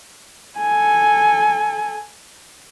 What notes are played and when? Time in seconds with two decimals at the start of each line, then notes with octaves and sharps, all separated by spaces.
0.58 A4 G#5